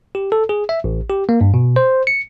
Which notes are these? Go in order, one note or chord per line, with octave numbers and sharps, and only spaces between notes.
G4
A4
G#4
E5
A1
G4
A#3
G2
B2
C5
C#7